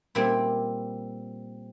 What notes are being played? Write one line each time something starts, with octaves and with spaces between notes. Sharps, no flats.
A#2 G3 C4 E4